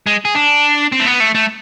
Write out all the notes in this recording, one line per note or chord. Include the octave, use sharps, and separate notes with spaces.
G#3
G#4
D4
C4
A3
B3
A3
A3